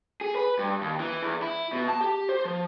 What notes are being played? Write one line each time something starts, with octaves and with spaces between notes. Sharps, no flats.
G#4
B4
G2
D#2
E3
E2
E4
B2
A5
G4
C5
F3